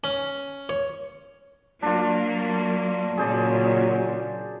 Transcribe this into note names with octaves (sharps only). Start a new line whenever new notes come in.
C#4
C#5
F#3 A#3 D4 F4
A#2 C#3 F#3 G#4 C5 D5